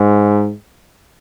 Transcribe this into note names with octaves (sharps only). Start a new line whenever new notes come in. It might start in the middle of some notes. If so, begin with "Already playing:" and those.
Already playing: G#2